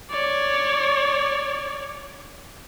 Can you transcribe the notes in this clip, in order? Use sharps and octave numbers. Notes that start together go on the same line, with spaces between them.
C#5 D5